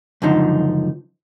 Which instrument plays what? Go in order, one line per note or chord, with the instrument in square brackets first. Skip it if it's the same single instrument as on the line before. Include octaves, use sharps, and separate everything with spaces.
[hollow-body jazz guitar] C#2 F#2 D3 F3 D#4